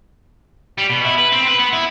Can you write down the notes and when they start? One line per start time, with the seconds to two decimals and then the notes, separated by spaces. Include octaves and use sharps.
0.78 G3
0.89 B2
1.05 E4
1.18 B4
1.32 C4
1.48 B4
1.59 B3
1.73 E4